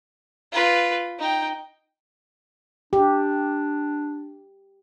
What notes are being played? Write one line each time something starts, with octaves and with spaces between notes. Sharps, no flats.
F4 B4
D#4 G5
D4 G4